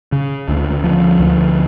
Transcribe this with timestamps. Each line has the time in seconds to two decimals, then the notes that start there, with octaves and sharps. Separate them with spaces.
0.12 C#3
0.48 D2
0.84 F3
1.20 D2